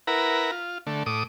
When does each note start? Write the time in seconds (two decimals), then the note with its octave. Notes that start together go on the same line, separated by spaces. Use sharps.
0.07 E4 A#4 B4 F#5 A#5
0.52 F4
0.87 D3 A3
1.06 A2 D6 D#6